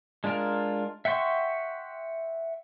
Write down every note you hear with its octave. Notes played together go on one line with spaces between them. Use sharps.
G#3 D4 F4 A#4
E5 F#5 G5 C6 C#6